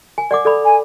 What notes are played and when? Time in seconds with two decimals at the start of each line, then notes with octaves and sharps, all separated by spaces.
0.18 G#5
0.31 D5 F#5 D6
0.45 A4 D5 B5
0.65 G#5